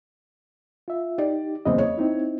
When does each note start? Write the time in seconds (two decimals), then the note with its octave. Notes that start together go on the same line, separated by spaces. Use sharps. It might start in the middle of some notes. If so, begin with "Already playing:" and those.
0.88 F4 E5
1.18 D#4 G4 D5
1.65 F#1 E2 C4 D#5
1.78 C#5
1.98 C4 D#4 E4